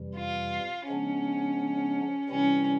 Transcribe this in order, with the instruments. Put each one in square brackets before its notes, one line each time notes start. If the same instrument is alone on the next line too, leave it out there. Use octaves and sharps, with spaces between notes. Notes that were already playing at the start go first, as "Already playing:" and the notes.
Already playing: [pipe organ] F2 C3 E3 G3
[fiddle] F4
[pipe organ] C#3 F3 G#3 B3 D4 [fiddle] C#4
[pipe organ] C3 E3 G3 C4 E4 [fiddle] C#4